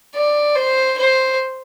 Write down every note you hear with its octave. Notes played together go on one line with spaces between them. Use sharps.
D5
C5
C5